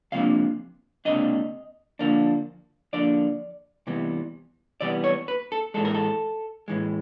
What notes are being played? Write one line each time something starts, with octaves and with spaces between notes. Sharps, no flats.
C#2 C3 F3 A#3 D4 F5
C#2 C3 F3 A#3 D4 D#5
D3 F3 A#3 D4
D3 F3 A#3 D4 D5
C3 E3 G3 B3
C3 E3 G3 B3 D5
C#5
B4
A4
A2 E3 G#3 A4
A#4
A4
A2 E3 G#3